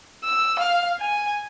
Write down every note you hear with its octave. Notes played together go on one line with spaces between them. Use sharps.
E6
F5
G#5